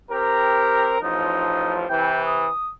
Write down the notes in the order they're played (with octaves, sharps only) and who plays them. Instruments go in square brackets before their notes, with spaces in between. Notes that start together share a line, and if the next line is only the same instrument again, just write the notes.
[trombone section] C4 A#4 [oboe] G4
[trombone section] A1 F3 [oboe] D#4
[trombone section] C3 E3 [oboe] G5
[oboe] D#6